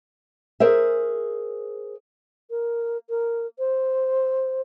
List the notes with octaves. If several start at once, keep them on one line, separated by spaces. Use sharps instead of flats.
G#4 A#4 C5 E5
A#4
A#4
C5